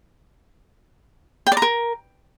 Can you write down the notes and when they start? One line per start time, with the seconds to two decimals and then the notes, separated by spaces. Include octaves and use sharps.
1.47 G5
1.52 D5
1.57 A#5
1.62 A#4